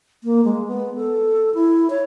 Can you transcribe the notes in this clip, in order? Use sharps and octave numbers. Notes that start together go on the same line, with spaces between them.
A#3
G#3
B3
A4
E4
C#5